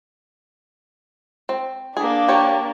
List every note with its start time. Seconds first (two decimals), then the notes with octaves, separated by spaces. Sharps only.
1.49 C4
1.97 A#3 D4 G#4
2.28 G4 C#5